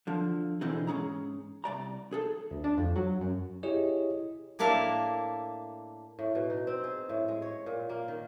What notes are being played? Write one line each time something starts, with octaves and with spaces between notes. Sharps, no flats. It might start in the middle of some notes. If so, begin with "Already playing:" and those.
D3 F3
B2 D3 E3 C4 D#4 G#4
G#2 C#4 G#4 A#5
C2 D5 A#5
G#4 A4
D2
D4
F2
F#3
F#2
E4 G4 G#4 C#5 D#5
A2 A#3 D4 E4 F5
A2
B2
D#4
C4
G#4
A2
G#3
C#5
A#2
A#3
D#3